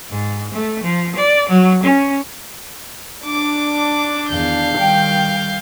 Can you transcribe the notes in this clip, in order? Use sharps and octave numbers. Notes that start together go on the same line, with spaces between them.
G#2
A3
F3
D5
F#3
C#4
D4 D6
E2 D#3 F5 G6
D#3 G3 G5